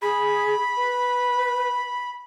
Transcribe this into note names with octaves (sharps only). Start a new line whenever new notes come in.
G#4 B5
B4